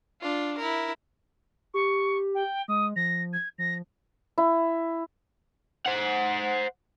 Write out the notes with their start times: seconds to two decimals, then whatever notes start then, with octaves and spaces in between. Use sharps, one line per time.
0.21 D4 F4
0.57 E4 A#4
1.74 G4 C#6
2.35 G5
2.68 G#3 D#6
2.96 F3 A#6
3.33 G#6
3.58 F3 A#6
4.38 E4
5.86 C5 F#5